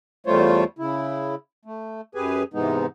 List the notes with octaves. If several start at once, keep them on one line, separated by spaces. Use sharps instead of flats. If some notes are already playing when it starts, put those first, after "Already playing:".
E2 G3 A3 F4 C5 C#5
C#3 E4
A3
F#2 G4 G#4 B4 G#5
G#2 C3 E3 G#3 B3 D#4